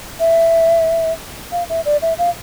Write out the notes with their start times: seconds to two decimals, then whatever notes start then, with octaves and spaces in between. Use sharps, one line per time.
0.20 E5
1.52 F5
1.69 E5
1.86 D5
2.02 E5
2.18 F5